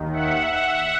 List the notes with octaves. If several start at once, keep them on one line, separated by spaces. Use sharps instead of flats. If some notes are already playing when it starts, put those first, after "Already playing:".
Already playing: D#2 D#3
E5 F#5